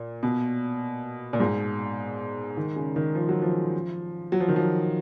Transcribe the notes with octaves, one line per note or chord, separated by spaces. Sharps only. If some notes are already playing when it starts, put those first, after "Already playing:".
Already playing: A#2
B2
A#2
G#2
D#3
C#3
D#3
F3
F#3
F3
F#3
F3
D#3
F3